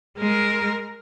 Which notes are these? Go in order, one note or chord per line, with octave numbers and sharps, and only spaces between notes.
G#3 A#4